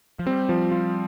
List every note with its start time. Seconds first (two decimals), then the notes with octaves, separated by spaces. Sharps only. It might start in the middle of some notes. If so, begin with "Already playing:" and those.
0.19 F3
0.26 G3 C4
0.49 F3
0.71 F4